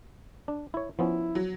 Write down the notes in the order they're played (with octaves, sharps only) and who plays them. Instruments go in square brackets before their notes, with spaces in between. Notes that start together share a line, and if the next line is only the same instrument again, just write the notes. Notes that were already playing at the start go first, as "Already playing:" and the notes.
[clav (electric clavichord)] D4
E4 C#5
[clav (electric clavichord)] F3 B3 C#4 [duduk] E4
[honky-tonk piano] F#3